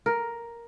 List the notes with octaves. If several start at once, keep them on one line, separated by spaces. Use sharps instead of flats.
A#4